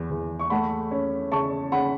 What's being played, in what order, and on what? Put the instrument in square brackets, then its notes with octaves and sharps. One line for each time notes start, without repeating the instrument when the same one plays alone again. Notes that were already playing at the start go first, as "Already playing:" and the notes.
Already playing: [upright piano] E2 B3
E2
C#6
A3 F#5 B5
C#4
C#3 A5 C#6
C#3 F#5 B5